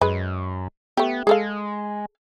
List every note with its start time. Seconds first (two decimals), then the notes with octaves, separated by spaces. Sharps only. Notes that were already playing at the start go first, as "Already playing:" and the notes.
0.01 F#2 G#3 B4
0.97 A3 B3 G4
1.27 G#3 G#4 A4 F5